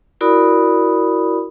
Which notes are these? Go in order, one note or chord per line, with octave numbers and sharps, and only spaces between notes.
E4 F#4 A#4 D5 B5 D#6